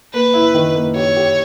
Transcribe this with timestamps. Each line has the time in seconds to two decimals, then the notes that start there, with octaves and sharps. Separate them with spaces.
0.14 A#3 B4
0.34 E4
0.54 D#3
0.75 A#3
0.96 G4 C#5
1.16 G4